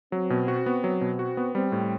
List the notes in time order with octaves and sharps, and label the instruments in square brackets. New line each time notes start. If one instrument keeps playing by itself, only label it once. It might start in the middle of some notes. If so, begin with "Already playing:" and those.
[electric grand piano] F#3 [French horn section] C4
[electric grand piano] B2
F#4
B3
F#3
B2
F#4
B3
[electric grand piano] G3 [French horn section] C4
[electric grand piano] A2